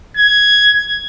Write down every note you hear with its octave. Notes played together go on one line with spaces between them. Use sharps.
G#6